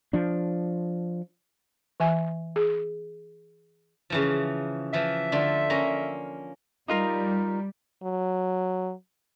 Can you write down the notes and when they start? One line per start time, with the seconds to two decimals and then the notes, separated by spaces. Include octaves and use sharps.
0.13 F3 D4
2.00 E3 E5 G#5
2.56 G#4
4.10 C#3 E3 F3
4.93 E3 F3 E5
5.32 D3 A3 F4
5.70 A#3 C#4 A#5
6.88 G3 D#4 F4 A#4
8.03 F#3